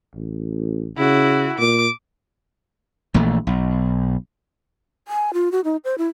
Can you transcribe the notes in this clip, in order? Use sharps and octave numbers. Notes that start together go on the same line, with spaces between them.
A1
C#3 E4 F#4
A#2 D6
A#1 A#2 E3 A3
B1
G#5
F4
F#4
D#4
C5
E4